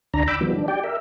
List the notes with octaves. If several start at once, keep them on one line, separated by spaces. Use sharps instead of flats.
D2 D4 A#5
G5 B5 D6 E6
D#3 F3 G3 B3
D4
G4 D5 G5
A#4 E5